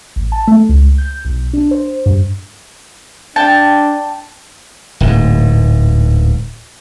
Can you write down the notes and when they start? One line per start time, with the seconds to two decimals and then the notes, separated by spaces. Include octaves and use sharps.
0.16 A1
0.32 A5
0.47 A3
0.69 C#2
0.98 G6
1.25 B1
1.53 D4
1.71 C5
2.06 G2
3.36 D4 G5 A5
5.01 D1 G#2